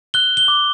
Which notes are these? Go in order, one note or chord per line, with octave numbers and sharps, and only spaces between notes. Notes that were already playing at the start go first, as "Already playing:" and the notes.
F#6 G7
G7
D6